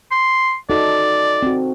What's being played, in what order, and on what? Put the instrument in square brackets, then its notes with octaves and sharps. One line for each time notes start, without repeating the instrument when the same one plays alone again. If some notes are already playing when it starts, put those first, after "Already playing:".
[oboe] C6
[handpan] D#4 F#4 A4 [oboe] D5
[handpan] C4 F#4